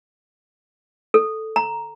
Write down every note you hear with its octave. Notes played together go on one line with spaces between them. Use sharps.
A4
A#5